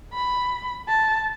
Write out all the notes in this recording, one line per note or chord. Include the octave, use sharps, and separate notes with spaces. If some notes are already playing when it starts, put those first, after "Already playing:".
B5
A5